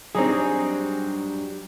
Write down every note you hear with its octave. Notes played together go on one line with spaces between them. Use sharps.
F#3 G3 C4 D4 D#4 G#4